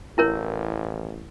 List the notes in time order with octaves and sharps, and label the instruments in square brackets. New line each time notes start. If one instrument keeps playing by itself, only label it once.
[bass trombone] A1 [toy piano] E4 A#4 C#5